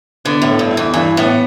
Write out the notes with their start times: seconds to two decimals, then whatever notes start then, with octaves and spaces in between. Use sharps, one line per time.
0.25 D3 B3
0.42 A2
0.48 A4
0.59 G2
0.71 E4
0.77 E2
0.94 G2 E3
1.17 A2 B3